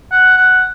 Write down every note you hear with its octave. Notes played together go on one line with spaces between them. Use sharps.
F#5
F#5